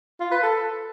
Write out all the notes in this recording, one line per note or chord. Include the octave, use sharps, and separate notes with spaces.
F4
B4
A4